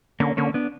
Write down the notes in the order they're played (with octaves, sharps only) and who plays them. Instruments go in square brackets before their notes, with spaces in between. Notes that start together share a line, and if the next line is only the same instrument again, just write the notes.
[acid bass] D3 [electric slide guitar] A#3 C#4
[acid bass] D3 [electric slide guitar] A#3 C#4
[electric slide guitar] B3 D4